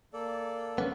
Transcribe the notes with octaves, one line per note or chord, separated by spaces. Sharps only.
A#3 A4 D5
B3 C#4